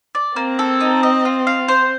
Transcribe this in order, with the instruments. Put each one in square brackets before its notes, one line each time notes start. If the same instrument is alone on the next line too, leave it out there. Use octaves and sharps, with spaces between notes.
[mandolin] D5
[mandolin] A#3 [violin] C4
[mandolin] A4
D#4
D#5
F4
F5
C5